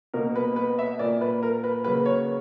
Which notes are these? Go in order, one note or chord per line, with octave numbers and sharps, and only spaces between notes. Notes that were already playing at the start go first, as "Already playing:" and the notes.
B2 A#3 A#4
B4
B4
E5
A#2 A#3 D5
B4
A#4
B4
C#3 F#3 A#3 B4
C#5